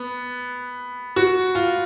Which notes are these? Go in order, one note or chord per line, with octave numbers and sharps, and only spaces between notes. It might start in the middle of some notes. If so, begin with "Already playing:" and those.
Already playing: B3
F#4
F4